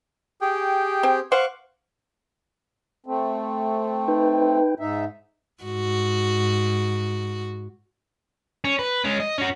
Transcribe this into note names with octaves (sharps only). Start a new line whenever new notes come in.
G4 G#4 G5
C4
C5 F5 F#5 C#6 D6
A3 C4
D#4 B4 G5
G#2 D#4 E5
G#2 F#4
C#4
B4
G#3 C#4
D#5
C#4 F#4